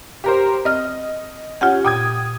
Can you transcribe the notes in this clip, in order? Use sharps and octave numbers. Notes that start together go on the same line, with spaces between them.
G4 A#4 C5
C4 D#5 F6
C#4 F4 G4 F#5
A#2 G5 D#6 G#6